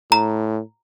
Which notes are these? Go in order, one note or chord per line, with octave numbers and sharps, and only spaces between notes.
A2 A#5